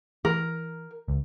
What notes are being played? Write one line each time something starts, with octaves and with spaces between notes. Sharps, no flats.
E3 A#4
C#2